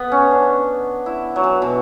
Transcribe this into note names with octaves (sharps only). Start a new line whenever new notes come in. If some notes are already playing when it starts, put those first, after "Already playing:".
Already playing: B3
C#4
D4
E4
F#3
E3
B2